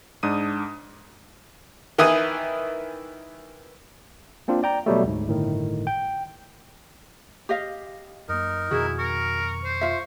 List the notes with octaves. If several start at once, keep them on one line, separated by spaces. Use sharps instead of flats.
G#2 D4 D#6 D#7
D#3 E3 E4 B4 G#5 D#6
A#3 C4 D4 F4
D5 G5 A#5
B2 F#3 G3 A3
D2 G#2
G1 A2 D#3
G5
G4 D#5 F5
F#2 A#3 D#4 A#4
F2 B2 D#3 E4 F#4 G#4
A#4 C#6
C5
F4 E5